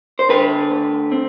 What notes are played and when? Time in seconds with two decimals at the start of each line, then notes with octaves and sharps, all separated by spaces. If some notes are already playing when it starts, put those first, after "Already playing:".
0.19 C5
0.29 D3 B4
0.70 D2
1.12 C4